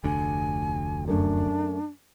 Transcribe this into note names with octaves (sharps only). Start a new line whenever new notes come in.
F1 D2 D3 G#5
F#2 A3 D4